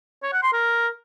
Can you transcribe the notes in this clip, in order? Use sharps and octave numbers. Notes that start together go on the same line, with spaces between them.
C#5
F#5
C6
A#4